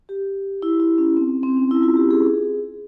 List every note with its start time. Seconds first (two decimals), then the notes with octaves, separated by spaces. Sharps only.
0.09 G4
0.62 E4
0.80 E4
0.98 C#4
1.17 C4
1.43 C4
1.57 C#4
1.71 E4
1.83 F4
1.97 G4
2.11 G#4